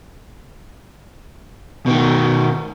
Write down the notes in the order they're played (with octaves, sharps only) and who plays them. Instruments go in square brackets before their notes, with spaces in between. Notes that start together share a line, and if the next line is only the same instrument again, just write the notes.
[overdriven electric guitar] B2 D#3